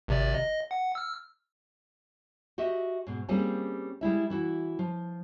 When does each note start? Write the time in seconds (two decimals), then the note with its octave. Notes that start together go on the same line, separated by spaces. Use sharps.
0.08 G#1 C3 D5
0.34 D#5
0.71 F#5
0.95 E6 F6
2.58 F#4 G4 D#5 E5
3.07 G#2 B2
3.29 G3 A#3 C4 C#4 F4 G#4
4.01 G3 G#3 E4 E5
4.30 E3 E4 F#4
4.79 F3